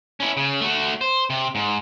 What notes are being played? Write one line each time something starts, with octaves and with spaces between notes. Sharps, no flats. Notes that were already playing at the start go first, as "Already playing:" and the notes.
C#4 E4
C#3
A3 F#4
C5
C3
G#2